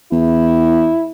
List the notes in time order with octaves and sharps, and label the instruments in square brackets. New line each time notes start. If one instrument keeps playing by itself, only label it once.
[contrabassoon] E2 [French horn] E4